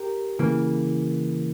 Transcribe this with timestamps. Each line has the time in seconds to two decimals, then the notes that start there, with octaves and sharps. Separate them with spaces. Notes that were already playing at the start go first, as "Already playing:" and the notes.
Already playing: G4 A#4
0.39 C#3 E3 A#3